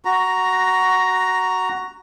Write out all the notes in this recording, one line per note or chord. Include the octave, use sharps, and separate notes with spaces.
F#4 A#5